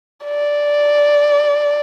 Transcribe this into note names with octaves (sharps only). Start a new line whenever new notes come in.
D5